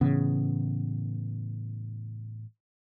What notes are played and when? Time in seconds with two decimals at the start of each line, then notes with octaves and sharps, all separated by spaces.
0.01 A2 C#3 E3 B3